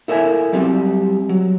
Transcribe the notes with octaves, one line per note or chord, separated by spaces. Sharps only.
E4 A4 A#4 E5 G#5
F#3 G3 C4
F#3